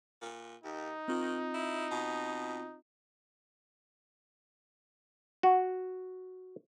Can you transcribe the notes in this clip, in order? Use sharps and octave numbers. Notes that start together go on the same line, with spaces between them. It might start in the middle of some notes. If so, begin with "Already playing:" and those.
A#2
D#2 D#4
D#3 C4 F4
E4
B2
F#4